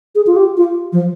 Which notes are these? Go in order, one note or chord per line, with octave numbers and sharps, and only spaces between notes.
G#4
F4
G4
F4
F3